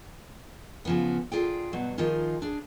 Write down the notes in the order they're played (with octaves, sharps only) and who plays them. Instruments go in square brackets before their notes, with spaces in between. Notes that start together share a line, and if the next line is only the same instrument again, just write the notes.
[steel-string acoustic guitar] C#3 F3 B3
D3 F4 G#4 G5
G2 B2 F#3
D#3 F3 D#4 F4 G#4
D4 G#4